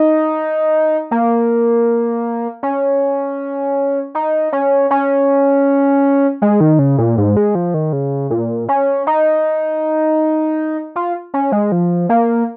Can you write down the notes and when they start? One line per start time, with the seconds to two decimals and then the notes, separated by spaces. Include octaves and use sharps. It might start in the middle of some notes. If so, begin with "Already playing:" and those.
Already playing: D#4
1.11 A#3
2.63 C#4
4.15 D#4
4.52 C#4
4.91 C#4
6.42 G#3
6.61 D#3
6.79 C#3
6.98 A#2
7.18 G#2
7.37 G#3
7.55 F3
7.74 D#3
7.93 C#3
8.30 A#2
8.69 C#4
9.07 D#4
10.96 F4
11.34 C#4
11.52 G#3
11.72 F3
12.09 A#3